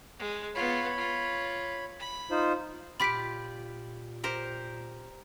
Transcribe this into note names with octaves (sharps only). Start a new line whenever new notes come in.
G#3
B3 F4 C#5 B5
F4
B5
D#4 F4 C5
A#2 F4 G4 B5 B6 D7
G4 A#4 C5